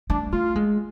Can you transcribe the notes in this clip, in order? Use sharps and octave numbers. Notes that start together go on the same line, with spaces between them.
A3 D4
A3 F4
G#3